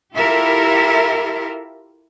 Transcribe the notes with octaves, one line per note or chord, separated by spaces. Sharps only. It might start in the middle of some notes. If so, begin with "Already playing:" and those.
E4 F4 G4 A4 A#4 E5